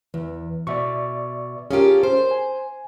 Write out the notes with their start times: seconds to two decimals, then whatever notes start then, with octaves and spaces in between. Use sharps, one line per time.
0.14 E2 E3
0.67 B2 D5 E5 C#6
1.71 C#4 F4 G4 G#4 A#4
2.03 C5
2.31 G#5